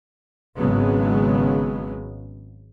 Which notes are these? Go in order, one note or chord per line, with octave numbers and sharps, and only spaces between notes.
G#1 C#3 F#3 G#3 B3